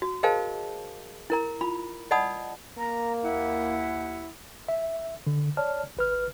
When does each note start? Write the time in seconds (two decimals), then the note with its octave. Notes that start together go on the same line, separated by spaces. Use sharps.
0.02 F#4
0.23 G#4 A#4 C5 D#5 F5 A5
1.30 E4 A#4 A#5
1.61 F4 B5
2.11 D5 D#5 F#5 A5 B5 D#6
2.78 A#3 A#5
3.23 D#2 E4 F#5
4.68 E5
5.27 D3
5.57 C#5 D5 A5 F6
5.97 G#1 B4 F6